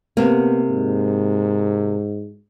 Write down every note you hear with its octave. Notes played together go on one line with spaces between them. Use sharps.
C3 A#3 B3
G#2